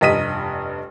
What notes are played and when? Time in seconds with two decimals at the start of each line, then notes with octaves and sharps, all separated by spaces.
0.01 F1 G2 D#5 B6 D#7